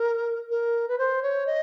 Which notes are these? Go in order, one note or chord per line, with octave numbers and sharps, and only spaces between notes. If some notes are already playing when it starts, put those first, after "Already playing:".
Already playing: A#4
A#4
B4
C5
C#5
D#5